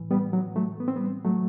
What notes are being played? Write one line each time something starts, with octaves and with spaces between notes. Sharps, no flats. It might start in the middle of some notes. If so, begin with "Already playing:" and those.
Already playing: A2 E3
G3 B3
F#3
F#3 A3
B3
C4
G3 B3
F#3 A3